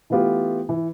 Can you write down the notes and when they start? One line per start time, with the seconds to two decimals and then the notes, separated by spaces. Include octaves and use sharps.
0.10 E3 A3 B3 F4 G4
0.69 E3